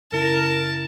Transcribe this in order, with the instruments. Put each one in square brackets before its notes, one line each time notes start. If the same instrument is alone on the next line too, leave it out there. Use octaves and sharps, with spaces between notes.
[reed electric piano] F#2 C#3 E4 [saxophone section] A#4 [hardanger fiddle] A5